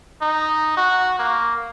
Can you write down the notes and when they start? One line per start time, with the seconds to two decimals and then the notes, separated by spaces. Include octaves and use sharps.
0.22 D#4
0.77 F#4
1.19 A#3